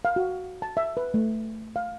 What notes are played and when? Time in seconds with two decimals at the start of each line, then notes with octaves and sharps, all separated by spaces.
0.05 F5
0.16 F#4
0.62 A5
0.77 E5
0.97 B4
1.14 A3
1.76 F5